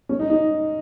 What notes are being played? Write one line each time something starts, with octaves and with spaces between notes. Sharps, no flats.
C#4
D#4
D#4